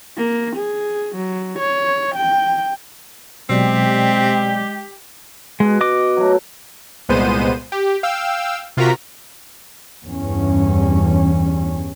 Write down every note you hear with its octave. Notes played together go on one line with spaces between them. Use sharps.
A#3
G#4
F#3
C#5
G5
B2 F#3 G#3 C4 G4 D5
B2 G#3
D#5 D6
F#3 A3
C2 A#2 G#3 B3 C5 D#7
G4
F5 G5 E6
C3 F4 F#4 A#4 A#5 B6
E2 G2 C#4